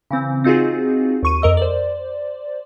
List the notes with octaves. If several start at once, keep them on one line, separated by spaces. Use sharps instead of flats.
C#3 E3 C4
C4 D#4 F4 F#4 G#4
D#2 C#6 D#7
F2 A#4 D#5 E6
C5 D5